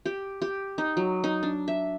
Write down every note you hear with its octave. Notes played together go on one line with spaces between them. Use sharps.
G4
G4
D#4
F#3
D#4
D4
E5